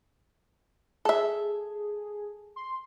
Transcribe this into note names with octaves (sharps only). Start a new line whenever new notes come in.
G#4 A4 E5
C6